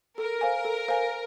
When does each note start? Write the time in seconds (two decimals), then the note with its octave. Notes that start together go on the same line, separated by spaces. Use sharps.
0.18 A4 A#4
0.41 C5 F5 G#5
0.65 A4
0.88 C5 F5 G#5